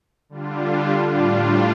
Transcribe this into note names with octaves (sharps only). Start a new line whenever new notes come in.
D3 G3 D4 F4
A2 G3 D4 F4